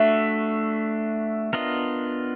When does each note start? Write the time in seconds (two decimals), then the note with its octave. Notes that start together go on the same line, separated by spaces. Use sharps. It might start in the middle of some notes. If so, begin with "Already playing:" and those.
Already playing: A3 D4 F#4 E5
1.53 B3 D4 F4 A#4 D#5